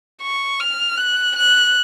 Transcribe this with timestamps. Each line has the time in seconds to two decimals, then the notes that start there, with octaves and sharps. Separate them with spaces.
0.22 C#6
0.60 F6
0.98 F#6
1.36 F#6